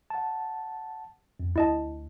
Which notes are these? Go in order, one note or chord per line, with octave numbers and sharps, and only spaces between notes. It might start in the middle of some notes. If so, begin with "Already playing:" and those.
F#5 A5
F2
D2 E4 D#5 A5